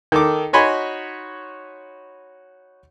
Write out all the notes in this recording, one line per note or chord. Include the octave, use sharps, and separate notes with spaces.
D#3 A4 D6
D#4 F#4 C#5 G#5 B5 C6